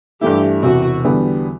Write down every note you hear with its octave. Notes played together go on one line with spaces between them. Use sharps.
G2 E3 A3 E4 G4
E1 E2 C3 F#4
E2 D3 G3 B3